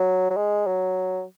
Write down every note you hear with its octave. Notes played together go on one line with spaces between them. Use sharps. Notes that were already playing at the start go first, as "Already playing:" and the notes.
Already playing: F#3
F#3
G#3
F#3